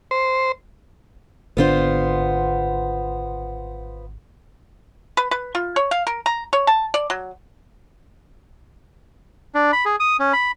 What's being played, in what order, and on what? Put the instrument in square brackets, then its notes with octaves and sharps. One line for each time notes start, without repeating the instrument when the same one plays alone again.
[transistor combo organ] C5
[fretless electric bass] G#1 D3 D4 [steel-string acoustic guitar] B3 F4 C5
[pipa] B4
B4
F4
C#5
F5
A#4
A#5
C#5
A5
D5
F#3
[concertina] D4
B5
G#4
D#6
C#4
B5